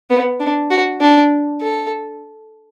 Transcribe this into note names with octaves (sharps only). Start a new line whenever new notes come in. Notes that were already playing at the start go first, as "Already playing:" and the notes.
B3
D4
F#4
D4
A4